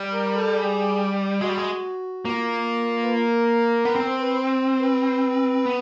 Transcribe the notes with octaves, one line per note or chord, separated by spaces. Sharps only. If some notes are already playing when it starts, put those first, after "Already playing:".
Already playing: G3
A#4
A4
G#4
G#3 F#4
G3
G#3
A#3 F4
B4
A#4
B3
C4
C5
B4
C5
B4
B3